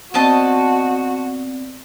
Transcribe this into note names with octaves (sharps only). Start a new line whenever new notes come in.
B3 C4 F#4 C5 D5 D#5 A5